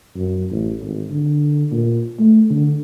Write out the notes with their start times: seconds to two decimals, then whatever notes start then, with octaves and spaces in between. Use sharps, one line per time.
0.16 F#2
0.51 A1
0.82 G#1
1.10 D3
1.72 A#2
2.20 A3
2.50 D3